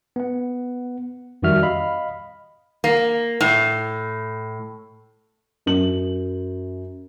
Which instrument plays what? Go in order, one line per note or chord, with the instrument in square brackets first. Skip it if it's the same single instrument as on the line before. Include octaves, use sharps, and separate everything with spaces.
[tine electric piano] B3 F#5
F2 D#3 G3 F#4 E5 F6
D#5 F5 B5
[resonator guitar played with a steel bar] A#3
A2
[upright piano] F#2 F#7